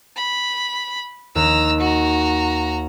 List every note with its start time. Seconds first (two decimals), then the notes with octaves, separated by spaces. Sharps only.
0.16 B5
1.35 D#2 A#5 E6
1.80 F#4 A#5